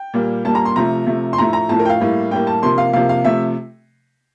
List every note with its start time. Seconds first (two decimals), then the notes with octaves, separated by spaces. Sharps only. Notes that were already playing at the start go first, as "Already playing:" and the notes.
Already playing: G5
0.14 A#2 G3 A#3
0.45 A#2 G3 A#3 A5
0.55 A#5
0.65 C6
0.76 C3 F3 A3 A#5
1.07 C3 F3 A3
1.33 C6
1.38 A2 F3 A3 A#5
1.53 A#5
1.69 A2 F3 A3 A5
1.79 A#4
1.85 G5
1.89 F5
2.00 A2 G3 A#3
2.31 A2 G3 A#3 G5
2.47 A5
2.63 C3 F3 A#3 C6
2.78 F5
2.93 C3 F3 A#3 F5
3.09 F5
3.24 C3 F3 A3 E5